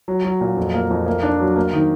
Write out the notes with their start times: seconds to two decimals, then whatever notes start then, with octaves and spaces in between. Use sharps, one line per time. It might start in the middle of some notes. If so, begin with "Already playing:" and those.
0.08 F#3
0.25 F#3
0.41 A#2
0.57 F2
0.74 A#3
0.90 F2
1.06 A#3
1.23 D4
1.40 F#3
1.56 A#3
1.73 D#3